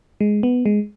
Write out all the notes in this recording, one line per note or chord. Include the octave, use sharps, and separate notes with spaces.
G#3
B3
G#3